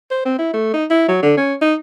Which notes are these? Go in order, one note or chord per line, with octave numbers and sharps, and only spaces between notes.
C5
C4
E4
A3
D#4
E4
F#3
D3
C#4
D#4